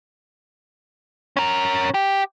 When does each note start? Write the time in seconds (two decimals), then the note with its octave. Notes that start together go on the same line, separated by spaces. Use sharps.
1.37 C#4 A#4
1.94 G4